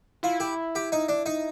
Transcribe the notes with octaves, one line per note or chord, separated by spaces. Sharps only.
E4 F4
G4
G4
D#4
D4
D#4